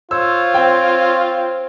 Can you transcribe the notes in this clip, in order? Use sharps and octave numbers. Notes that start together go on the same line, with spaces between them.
F4 C5 C#5 E6
C4 G5